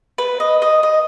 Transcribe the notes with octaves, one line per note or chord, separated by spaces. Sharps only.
B4
D#5
D#5
D#5